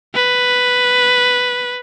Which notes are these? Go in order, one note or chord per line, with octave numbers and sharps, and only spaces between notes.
B4